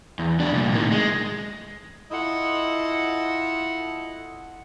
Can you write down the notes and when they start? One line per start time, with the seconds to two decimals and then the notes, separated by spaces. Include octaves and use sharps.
0.19 E2
0.39 F2 D4
0.54 C2 A#2
0.72 A2 D#3
0.92 G#3
2.12 E4 F4 A4 D#5 F#5